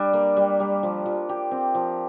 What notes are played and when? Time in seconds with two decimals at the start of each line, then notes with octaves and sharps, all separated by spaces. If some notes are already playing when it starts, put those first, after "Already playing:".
Already playing: G3 D4
0.13 A#3
0.37 G3
0.60 G3
0.83 F3
1.06 F3
1.29 G4
1.51 C4
1.75 F3